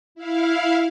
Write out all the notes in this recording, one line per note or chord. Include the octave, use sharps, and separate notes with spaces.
E4 F5